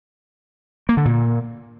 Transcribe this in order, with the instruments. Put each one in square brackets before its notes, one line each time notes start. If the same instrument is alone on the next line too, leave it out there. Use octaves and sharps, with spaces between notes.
[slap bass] A#3
D3
A#2